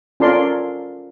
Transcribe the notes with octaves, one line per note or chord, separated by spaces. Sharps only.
C#4 F4 A4 A#4 D5 C6